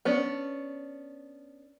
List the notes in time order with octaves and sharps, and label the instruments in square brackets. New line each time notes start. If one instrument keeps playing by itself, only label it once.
[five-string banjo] B3 C#4 D4